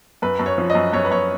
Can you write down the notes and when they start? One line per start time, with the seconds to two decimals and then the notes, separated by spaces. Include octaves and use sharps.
0.22 F#2 B4
0.39 F#2
0.46 C#5
0.58 F3
0.70 D#5
0.75 F#2
0.93 F#2 C#5
1.05 B4
1.11 F#2 C#5